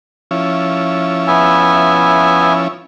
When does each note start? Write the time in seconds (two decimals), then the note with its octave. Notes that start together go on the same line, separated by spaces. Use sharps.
0.31 F3 C#4 E4
1.27 B3 E5 G#5